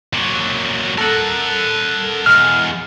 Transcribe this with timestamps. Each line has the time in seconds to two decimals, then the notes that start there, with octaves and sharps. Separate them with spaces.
0.14 A#2 F#3
0.98 A4 A#4 F#5
2.26 E2 G#3 F6